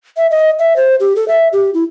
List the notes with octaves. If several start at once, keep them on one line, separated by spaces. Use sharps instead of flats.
E5
D#5
E5
C5
G4
A4
E5
G4
E4